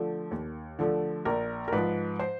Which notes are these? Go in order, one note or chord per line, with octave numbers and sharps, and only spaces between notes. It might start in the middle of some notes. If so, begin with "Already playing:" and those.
Already playing: D3 F3 A3
D#2
D3 F3 A3
A#1 A#4
A#4
G#2 F3 B4
C5